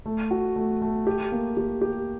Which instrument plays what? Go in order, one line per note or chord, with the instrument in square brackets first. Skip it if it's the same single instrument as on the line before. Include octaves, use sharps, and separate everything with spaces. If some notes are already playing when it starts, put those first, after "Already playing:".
[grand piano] A3
F#4
A3
A3
G4
A#3
G4
G4